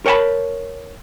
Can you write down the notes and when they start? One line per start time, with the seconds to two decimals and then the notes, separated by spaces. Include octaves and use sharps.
0.06 A#4 C#5 F#5 G5 A5 B5